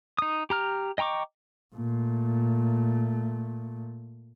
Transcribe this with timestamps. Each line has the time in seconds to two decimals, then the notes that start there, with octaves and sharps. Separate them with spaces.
0.19 D#4 D#6
0.50 G4 A#5 F6
0.98 D#5 G5 A#5 C#6 D6
1.75 A#2 A3